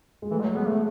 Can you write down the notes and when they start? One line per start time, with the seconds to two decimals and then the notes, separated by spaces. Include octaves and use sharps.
0.22 G#3
0.31 E3 A3
0.39 G#3
0.43 F#3
0.56 G#3 B3
0.68 A3